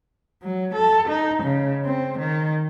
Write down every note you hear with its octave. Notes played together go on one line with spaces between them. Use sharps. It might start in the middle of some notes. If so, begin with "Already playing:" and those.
F#3
A4
D#4
C#3
C4
D#3